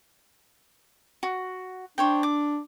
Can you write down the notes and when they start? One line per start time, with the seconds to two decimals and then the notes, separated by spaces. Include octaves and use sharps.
1.23 F#4
1.98 D4 C5 C#5 G5
2.23 D6